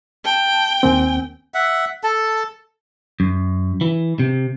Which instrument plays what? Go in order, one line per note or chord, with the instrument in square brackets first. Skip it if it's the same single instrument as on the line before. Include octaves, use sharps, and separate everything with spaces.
[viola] G5 [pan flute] A5
[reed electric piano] D#2 A#3 C4 [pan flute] G#5
[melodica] E5 F#5
A4 A5
[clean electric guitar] F#2
E3
C3